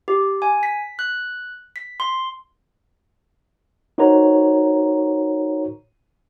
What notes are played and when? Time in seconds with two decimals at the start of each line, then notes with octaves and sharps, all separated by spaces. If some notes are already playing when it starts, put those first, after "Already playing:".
0.08 G4
0.42 G#5
0.63 B6
0.99 F#6
1.76 B6
2.00 C6
3.98 D#4 F#4 A#4 C5 C#5 A#5